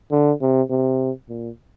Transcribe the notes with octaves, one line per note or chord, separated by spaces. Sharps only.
D3
C3
C3
A#2